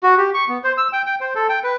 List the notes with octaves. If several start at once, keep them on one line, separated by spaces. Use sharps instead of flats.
F#4
G4
C#6
B3
C5
E6
G5
G5
C5
A4
G5
B4